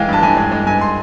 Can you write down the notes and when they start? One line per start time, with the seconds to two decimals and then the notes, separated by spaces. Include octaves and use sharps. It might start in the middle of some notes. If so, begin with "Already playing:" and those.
Already playing: E3 G#3 F5 G5
0.09 G2 A5
0.23 G2 G#5
0.37 G#3
0.52 G#3
0.67 G2 G#5
0.81 C6